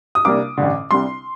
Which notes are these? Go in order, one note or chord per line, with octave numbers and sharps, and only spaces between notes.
D#6
C2 C3 G3 A#3 D4 D6
A1 G2 D3
C2 C3 G3 D4 C6